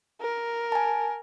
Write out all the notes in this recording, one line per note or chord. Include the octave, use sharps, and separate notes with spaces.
A#4
G#5 A5